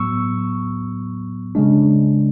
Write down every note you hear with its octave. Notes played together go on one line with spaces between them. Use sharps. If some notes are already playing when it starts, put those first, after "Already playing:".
Already playing: A2 F#3 B3 C#6 E6
C#3 G#3 D4